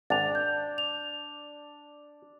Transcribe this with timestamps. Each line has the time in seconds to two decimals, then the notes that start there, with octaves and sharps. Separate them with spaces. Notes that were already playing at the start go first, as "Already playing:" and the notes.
0.10 G#1 D4 A6 F7
0.35 G6
0.78 F7